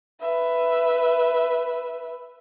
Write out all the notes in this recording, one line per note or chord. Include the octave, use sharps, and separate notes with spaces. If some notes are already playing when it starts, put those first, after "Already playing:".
B4 E5